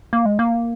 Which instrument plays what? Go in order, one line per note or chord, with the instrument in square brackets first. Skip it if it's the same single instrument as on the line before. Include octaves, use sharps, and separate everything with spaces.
[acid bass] A#3
G#3
A#3